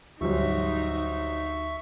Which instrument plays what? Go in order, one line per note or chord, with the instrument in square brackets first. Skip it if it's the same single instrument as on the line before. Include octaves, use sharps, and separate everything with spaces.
[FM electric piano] D2 [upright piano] G#2 F#3 G3 [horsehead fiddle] D#4 [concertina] E5 C#6